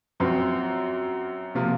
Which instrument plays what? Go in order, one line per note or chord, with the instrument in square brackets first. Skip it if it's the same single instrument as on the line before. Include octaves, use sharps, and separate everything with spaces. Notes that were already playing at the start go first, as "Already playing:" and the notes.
[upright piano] F#2 F3 C4
C3 F3 A#3 F4